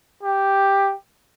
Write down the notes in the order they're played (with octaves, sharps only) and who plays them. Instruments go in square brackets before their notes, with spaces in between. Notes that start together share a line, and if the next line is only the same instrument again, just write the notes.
[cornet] G4